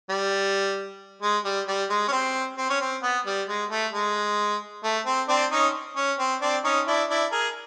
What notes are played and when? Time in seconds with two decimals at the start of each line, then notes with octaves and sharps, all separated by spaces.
0.09 G3
1.22 G#3
1.45 G3
1.68 G3
1.90 G#3
2.08 C#4
2.12 C4
2.57 C4
2.70 C#4
2.81 C4
3.03 B3
3.26 G3
3.48 G#3
3.71 A3
3.93 G#3
4.83 A3
5.06 C4
5.28 C4 D4
5.51 C#4 D#4
5.96 C#4
6.19 C4
6.41 C4 D4
6.64 C#4 D#4
6.87 D4 E4
7.09 D4 E4
7.32 G#4 A#4